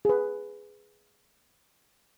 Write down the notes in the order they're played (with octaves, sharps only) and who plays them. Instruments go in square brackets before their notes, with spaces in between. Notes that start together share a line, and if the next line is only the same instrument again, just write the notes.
[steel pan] G#4 B4